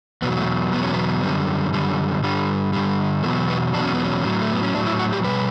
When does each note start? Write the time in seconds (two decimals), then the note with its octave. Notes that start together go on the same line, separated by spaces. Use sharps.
0.22 E2 B2 F#3 B3
0.39 A3
0.73 E2 B2 F#3 B3
0.83 C#4
0.93 B3
1.23 F#2 D3 G3
1.73 F#2 D3 G3
2.23 G2 D3 G3
2.73 G2 D3 G3
3.24 E2 B2 F#3 A3
3.49 B3
3.74 E2 B2 F#3 D4
3.83 C#4
3.94 B3
4.04 C#4
4.24 A2 F#3
4.41 A3
4.52 B3
4.63 C#4
4.75 A2 F#3 D4
4.87 E4
4.99 F#4
5.13 G4
5.24 B2 G3 B4